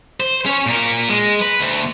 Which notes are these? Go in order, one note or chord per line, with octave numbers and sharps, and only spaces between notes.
C5
C#4 C#5
A#2 A#4
G#3
B4
D2